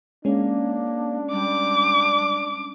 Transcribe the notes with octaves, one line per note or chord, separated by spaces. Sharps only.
G#3 A#3 C#4 D4
G3 D6